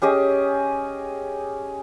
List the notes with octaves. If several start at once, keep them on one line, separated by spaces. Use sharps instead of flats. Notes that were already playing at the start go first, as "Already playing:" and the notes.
C#4 G4 G#4 D#5